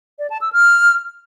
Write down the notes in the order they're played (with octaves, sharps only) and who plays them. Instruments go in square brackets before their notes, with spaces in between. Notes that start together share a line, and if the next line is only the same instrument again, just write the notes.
[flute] D5
A5
E6
F6